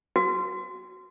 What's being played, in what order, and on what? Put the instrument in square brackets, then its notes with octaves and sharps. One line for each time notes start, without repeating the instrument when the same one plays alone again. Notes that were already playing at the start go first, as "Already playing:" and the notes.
[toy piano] F#4